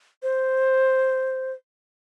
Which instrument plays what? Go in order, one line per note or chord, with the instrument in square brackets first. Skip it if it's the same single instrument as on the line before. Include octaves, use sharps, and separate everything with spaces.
[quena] C5